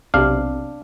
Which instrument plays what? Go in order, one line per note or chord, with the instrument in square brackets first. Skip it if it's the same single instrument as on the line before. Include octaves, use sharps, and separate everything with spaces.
[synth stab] B1 C3 [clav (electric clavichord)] D4 F5